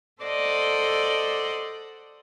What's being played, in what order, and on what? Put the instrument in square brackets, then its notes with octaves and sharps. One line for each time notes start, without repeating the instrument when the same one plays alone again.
[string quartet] A4 C5 D5 D#5 F#5